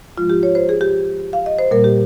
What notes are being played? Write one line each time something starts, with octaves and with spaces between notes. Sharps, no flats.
G#2 F3 G#3 F4
G4
C#5
C5
G#4
G4
F5
D#5
C5
A#2 G3 A#3 A#4
G4